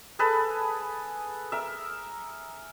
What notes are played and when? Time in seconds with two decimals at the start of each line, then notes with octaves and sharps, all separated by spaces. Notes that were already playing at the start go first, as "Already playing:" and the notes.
0.19 G#4 A4 B4 B5
1.52 A#4 E5